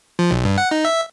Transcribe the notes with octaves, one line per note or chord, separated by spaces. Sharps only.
F3
B1
G2
F#5
D#4
E5